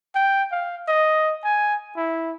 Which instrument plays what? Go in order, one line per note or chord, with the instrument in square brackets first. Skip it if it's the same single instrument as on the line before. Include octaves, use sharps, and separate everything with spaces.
[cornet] G5
F5
D#5
G#5
E4